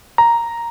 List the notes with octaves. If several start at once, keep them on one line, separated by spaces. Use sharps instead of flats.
A#5